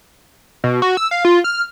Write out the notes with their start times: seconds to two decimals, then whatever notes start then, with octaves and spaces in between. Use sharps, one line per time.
0.64 B2
0.82 F#4
0.97 E6
1.11 F5
1.25 F4
1.44 F6